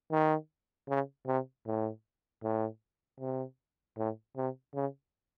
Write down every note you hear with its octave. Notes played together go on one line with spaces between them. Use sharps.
D#3
C#3
C3
A2
A2
C3
A2
C3
C#3